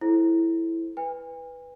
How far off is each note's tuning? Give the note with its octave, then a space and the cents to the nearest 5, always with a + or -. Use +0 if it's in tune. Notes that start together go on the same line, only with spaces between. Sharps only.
E4 +0 A4 -30 C5 +0
B4 +0 G#5 -45